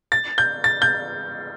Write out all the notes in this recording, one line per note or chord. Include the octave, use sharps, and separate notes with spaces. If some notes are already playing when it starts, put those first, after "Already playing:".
A6
G6
A6
G6